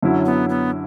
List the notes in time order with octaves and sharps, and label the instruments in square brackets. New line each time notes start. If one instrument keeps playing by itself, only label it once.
[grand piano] F#2 D3 F#3 C#4 E4
[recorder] B3
B3